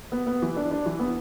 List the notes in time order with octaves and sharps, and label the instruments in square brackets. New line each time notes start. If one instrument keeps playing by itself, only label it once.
[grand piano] B3
B3
E3
D4
D4
E3
B3